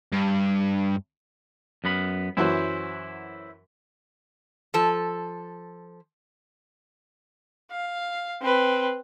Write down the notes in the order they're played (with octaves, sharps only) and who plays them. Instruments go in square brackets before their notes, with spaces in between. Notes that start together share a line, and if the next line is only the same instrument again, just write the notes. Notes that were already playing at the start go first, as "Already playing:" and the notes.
[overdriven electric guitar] G2
[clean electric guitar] F#2 B3 B5
[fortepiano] F#2 E3 F#3 [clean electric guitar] E4 C5
[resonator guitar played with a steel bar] F3 A4
[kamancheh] F5
C4 B4